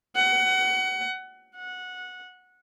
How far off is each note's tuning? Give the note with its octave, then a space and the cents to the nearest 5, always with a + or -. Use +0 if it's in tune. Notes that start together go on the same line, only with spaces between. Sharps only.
F#5 +25
F#5 -15